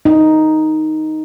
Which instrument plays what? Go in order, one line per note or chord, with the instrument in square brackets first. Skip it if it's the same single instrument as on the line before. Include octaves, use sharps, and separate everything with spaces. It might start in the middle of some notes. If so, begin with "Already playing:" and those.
[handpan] D#4